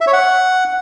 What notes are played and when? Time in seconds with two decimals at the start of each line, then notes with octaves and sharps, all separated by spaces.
0.01 E5
0.07 C#5
0.13 F#5